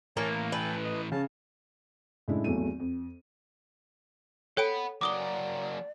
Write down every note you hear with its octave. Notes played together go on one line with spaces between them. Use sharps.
A2 E3 A#3 C#5 G#5 A5
A#4
A4 B4 G5 G#5
D#5
C#3 C#4 A5
A2 C#3 G#3 D4 E4
G#1 E2 F#3 A3 D#7
F2
A4 C#5 F#5 G5 B5 D7
F#3 A#3 D5 D6 D#6 G7